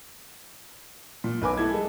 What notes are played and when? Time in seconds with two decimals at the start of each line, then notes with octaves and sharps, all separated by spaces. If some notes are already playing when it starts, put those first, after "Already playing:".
1.24 A#2
1.42 B1 B4 G#5 D6
1.57 A3 E4 A4 G#6
1.73 G#3 A4